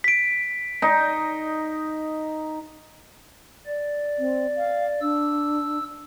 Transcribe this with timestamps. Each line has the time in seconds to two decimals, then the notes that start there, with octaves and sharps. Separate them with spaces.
0.04 B6 D7
0.82 D#4
3.66 D5
4.19 C4
4.57 F5
5.01 D4 E6